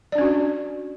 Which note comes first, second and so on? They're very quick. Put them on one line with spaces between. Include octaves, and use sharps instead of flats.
D5 D4 C#4 F#4